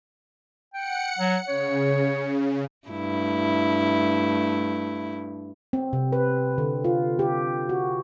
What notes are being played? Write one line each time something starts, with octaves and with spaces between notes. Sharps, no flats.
F#5 G5 C#7
F#3
C#3 C#5
G2 A3 E4
C4
C3
B4
D3
F4
G4
F#4